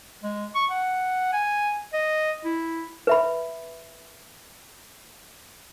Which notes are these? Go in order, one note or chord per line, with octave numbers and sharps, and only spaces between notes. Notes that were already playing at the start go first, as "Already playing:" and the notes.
G#3
C#6
F#5
G#5
D#5
E4
B4 E5 B5